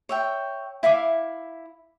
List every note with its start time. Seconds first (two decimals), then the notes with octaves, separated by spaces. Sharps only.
0.09 C#5 E5 G5
0.83 E4 E5 F5 D6